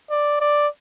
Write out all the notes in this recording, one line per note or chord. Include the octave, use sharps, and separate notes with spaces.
D5
D5